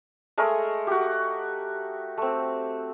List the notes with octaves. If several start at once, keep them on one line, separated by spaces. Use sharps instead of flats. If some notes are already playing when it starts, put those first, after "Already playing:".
G#3 A3 A#4 D#5
F#4 G4
A3 C4